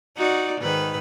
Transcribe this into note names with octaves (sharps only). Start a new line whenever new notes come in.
D#4 F#4 D5
G#2 D#3 B4